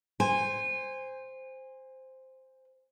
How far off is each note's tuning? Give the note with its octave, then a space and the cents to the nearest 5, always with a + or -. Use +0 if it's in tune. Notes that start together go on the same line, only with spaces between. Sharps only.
C5 +0 G#5 -25